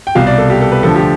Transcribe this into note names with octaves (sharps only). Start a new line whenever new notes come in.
G5
C2 B2 G3 F5
D5
A4
G4
A4
B4
D2 D3 F3 A4
G4